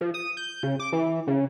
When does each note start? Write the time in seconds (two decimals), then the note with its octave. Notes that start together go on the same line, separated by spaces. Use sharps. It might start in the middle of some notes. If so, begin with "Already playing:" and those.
0.01 F3
0.14 D#6
0.37 G6
0.63 C#3
0.80 D6
0.92 E3
1.27 C#3